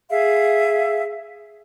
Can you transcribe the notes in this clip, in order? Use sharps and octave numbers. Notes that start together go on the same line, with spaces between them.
G#4 E5 F5